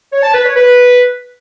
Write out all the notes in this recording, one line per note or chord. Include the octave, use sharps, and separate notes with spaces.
C#5
A5
B4
C#5
B4